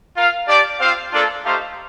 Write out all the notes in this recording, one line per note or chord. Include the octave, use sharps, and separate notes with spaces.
F4 A#4 F5
D4 G4 D5
C4 F4 C5 F5
A#3 D4 F4 A4 D5
A3 D#4 G4 C5 F5